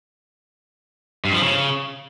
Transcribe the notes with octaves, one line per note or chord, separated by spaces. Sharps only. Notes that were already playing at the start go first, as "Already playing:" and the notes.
G2
F3
C#3